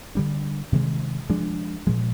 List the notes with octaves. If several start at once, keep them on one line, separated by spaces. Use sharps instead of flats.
D3 G3 D4
C3 D#3 G#3
F3 G#3 D4
A#2 F3 G#3